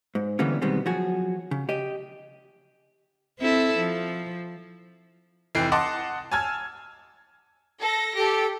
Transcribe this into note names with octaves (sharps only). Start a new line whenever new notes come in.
G#2
D3 E3 G3 A#3 B3 C#4
B2 D#3 G3 G#3 B3 C4
F3 F#3 F#4 G#4
C#3
G4 D#5
C4 E4 A4
F3
F1 E3 G5 C7
D#5 F#5 A5 C6 D6
G#5 A5 E6 F6 G#6
A4 A#6
G4 A4